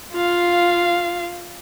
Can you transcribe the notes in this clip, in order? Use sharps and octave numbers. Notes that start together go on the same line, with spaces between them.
F4 F5